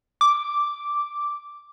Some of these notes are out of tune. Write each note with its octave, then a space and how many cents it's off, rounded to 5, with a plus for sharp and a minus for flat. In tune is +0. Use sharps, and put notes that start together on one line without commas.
D6 +0